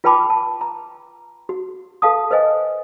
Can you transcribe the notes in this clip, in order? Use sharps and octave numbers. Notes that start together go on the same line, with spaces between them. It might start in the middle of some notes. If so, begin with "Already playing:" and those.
F4 B4 G5 A5 B5 D6
A5
A#5
F#4
A4 B4 F5 A5 D#6
B4 C5 D#5 G#5